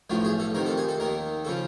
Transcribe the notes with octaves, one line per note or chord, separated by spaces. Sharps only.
B1 A2 F3 D4
G#4
A4
F2 C3 D#3 A#4
A4
G#4
A4
D#2 D#3 A#4
C#3 F3 A4